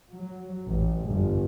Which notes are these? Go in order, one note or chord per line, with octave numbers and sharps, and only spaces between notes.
F#3
A1
G1